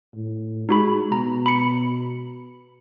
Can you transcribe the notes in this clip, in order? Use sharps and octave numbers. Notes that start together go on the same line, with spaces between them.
A2
G#3 D#4 F#4 B5
B2 A#5
B5 C#7